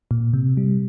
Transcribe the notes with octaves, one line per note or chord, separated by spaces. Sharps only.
A#2
C3
G3